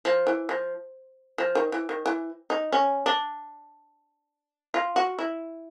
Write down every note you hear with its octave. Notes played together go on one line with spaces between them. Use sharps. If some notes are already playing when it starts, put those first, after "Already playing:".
F3
E3
F3
F3
D#3
E3
D#3
E3
D#4
C#4
D4
F4
F#4
E4